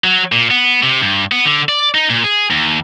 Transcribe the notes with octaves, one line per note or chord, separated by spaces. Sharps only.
F#3
A#2
B3
C3
G2
B3
D3
D5
D#4
A#2
G#4
D#2